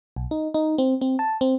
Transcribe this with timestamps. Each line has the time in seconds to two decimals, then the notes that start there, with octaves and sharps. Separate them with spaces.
0.16 B1
0.31 D#4
0.54 D#4
0.78 C4
1.01 C4
1.19 A5
1.41 C4